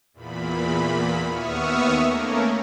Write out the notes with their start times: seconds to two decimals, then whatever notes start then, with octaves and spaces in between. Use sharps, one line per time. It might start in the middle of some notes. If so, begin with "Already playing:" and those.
0.14 E2 A#2 B5
1.26 D#2 B3 E5 C#6 D#6 F6
2.01 A3 A#3 C#4 A#4